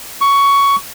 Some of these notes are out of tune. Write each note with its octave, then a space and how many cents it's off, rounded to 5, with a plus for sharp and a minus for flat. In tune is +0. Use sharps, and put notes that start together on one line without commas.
C#6 +15